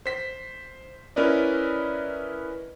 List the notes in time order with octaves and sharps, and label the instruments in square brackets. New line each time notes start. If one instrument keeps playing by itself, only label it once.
[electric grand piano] C5 B6
C#4 E4 A#4 B4 D5 D#5